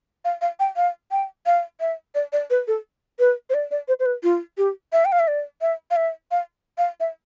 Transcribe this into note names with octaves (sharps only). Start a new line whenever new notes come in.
F5
F5
G5
F5
G5
F5
E5
D5
D5
B4
A4
B4
C5
D5
D5
C5
C5
B4
F4
G4
E5
G5
F5
E5
D5
E5
F5
E5
F5
F5
E5